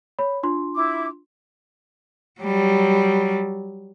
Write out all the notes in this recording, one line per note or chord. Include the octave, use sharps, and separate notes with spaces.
C#5 B5
D4 F4 C6
E4 D6
F#3 G3